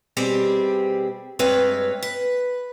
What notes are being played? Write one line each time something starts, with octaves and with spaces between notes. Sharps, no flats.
B2 G3 C4 G4 G#4
G2 G#3 C4 B4 C#5 F5
B4